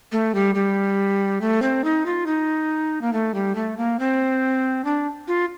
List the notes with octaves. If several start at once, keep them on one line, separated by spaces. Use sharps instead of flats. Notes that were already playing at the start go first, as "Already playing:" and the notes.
A3
G3
G3
A3
C4
D#4
F4
D#4
A#3
A3
G3
A3
A#3
C4
D4
F4